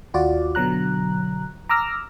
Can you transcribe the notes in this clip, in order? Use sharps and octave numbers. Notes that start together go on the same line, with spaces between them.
D#2 F4 F#4 D5
B2 D3 F#3 A#5 F#6
A#5 D6 E6 F6 A#6